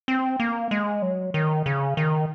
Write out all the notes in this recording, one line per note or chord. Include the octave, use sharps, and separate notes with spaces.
C4
A#3
G#3
F#3
D#3
C#3
D#3